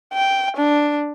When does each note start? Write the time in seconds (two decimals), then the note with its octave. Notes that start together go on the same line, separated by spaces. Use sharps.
0.13 G5
0.57 D4